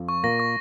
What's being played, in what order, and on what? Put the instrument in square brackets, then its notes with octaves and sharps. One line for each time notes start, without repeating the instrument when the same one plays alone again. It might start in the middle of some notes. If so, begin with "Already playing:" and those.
Already playing: [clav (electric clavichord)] F2 F3
[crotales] C#6
[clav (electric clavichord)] A#2 A#3 [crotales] A#6
[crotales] C#6